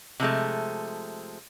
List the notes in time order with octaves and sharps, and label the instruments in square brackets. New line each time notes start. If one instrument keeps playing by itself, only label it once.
[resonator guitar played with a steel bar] C3 F3 G#3 A3